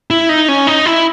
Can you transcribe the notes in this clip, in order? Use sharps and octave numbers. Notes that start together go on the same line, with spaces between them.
E4
D#4
C#4
D#4
E4